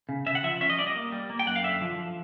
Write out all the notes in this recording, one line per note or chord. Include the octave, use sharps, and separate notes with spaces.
C#3
C#3 E5
F#5
F3 E5
C#4 E5
D#5
G3 D5
D#5
A#3
G3
A#3
G5
F#2 F#5
F5
D3 E5
F3
F3